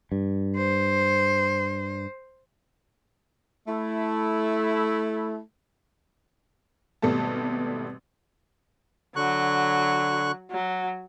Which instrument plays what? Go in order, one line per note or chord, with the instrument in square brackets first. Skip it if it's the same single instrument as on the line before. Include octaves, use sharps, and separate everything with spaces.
[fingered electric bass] G2
[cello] C5
[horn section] A3 E4
[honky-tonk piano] G#1 B2 G3 A3 A5
[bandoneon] D3 C#6 F#6 [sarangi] F#3
[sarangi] F#3